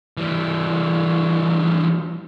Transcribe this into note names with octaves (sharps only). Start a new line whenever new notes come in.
E3 G3